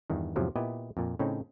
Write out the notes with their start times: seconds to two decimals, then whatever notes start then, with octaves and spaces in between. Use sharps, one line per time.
0.10 E2 G2 D#3
0.36 E2 G#2 C3 F3 F#3
0.56 A#2 B3 E4 G4 D#5
0.97 F2 A#2
1.19 A2 C#3 C4 C#4 D#4